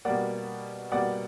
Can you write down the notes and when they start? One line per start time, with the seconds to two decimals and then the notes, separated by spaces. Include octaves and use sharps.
0.05 B2 G3 A#3 D5 F#5
0.92 B2 G3 A#3 D5 F#5